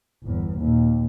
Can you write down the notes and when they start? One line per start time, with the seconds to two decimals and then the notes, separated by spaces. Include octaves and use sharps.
0.23 G1 E2
0.59 D#2 A#2